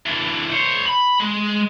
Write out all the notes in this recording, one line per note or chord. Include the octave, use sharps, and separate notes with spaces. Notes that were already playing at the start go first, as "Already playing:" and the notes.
E3 D4
C5 C#5
B5
G#3